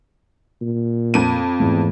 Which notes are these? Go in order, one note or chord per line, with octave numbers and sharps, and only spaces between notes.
A#2
F2 D#7
E2 G#2 E3 A3